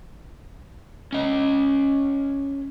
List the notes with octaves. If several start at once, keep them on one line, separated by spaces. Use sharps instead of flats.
C#4 D#5